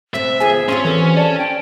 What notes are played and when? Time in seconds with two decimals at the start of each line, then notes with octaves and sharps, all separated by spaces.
0.14 B2 A3 C4 E5
0.40 D#2 F3 B3 G#4 G#5
0.69 C4 C#4 F4 G4 C6
0.85 E3 A4
1.17 D5 A5
1.38 G5